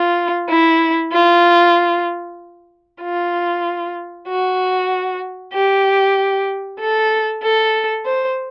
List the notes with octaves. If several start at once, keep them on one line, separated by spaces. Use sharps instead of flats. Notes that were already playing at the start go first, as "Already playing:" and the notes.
Already playing: F4
E4
F4
F4
F#4
G4
A4
A4
C5